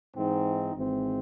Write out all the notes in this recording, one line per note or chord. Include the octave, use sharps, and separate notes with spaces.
G#2 E3 C4 D#4
G#1 G#2 E3 C4